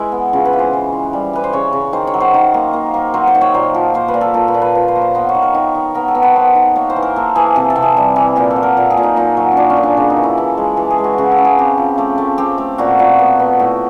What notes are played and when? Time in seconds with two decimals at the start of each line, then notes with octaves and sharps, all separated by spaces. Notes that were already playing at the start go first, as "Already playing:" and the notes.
Already playing: E3 G#3 E4 B4
0.12 B3
0.33 C#3 F4
0.45 B4
0.53 E3
0.59 C5
0.73 E3
0.92 E3
1.13 G3
1.33 E3 B4
1.44 C5
1.53 C#3 C#5
1.73 C#3
1.93 D#3 C5
2.07 C#5
2.14 F#3
2.20 C5
2.34 D#3
2.54 A#3
2.73 A#3
2.94 A#3
3.14 F#3 C5
3.27 C5
3.35 D#3
3.41 C#5
3.54 A#2 C5
3.74 F3
3.94 A#3 C5
4.08 B4
4.14 A#2
4.21 A4
4.34 A#2 A4
4.48 B4
4.54 A#2
4.62 B4
4.75 F3 B4
4.88 C5
4.95 A#3
5.01 C5
5.15 B3 C5
5.29 C#5
5.35 D#3
5.42 A#4
5.54 D#3
5.75 D#3
5.95 B3 A#4
6.08 A4
6.15 B3
6.23 B4
6.36 B3 C5
6.55 D#3
6.76 A#3 C#5
6.90 C5
6.96 E3
7.02 A#4
7.16 A#3 A4
7.35 E3 G#4
7.56 C3 A4
7.70 A4
7.76 C3
7.82 G#4
7.97 G3
8.16 E3
8.36 A#2 G4
8.50 A4
8.56 F#3
8.63 A#4
8.77 A#2 A4
8.90 G#4
8.97 A#2
9.03 D#4
9.16 A#2 D#4
9.37 F#3
9.52 C#4
9.57 A#2 D4
9.70 C#4
9.77 A#2
9.83 D4
9.97 C#3 D4
10.10 D#4
10.17 E3
10.23 E4
10.38 E3 A4
10.57 G#3
10.77 E3 A4
10.90 G#4
10.98 G#3
11.04 F#4
11.18 C#3 F#4
11.32 A4
11.38 C#3
11.45 G#4
11.59 C4 G4
11.77 F3
11.98 A3 G4
12.18 A3
12.38 C4 G4
12.58 A3
12.78 A#2 F#4
12.99 A#2
13.19 B3
13.39 B3
13.59 A2